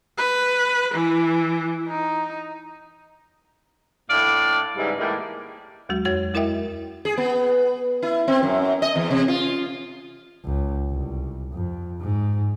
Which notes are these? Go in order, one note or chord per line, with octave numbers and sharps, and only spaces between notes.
B4
E3
D#4
A2 A3 D4 D5 F5
G#2 C#3 E3 G3
A2 E3 G3 G#3 A#3
D#2 F#3 G#3 F#4
F2 F#4 C#5 A6
G#3 E4 A#4 D#5 E5 G5
G#4
B3
E4
C4
F#2
D#5
E2
C3
F4
C#2
C2
F2
G#2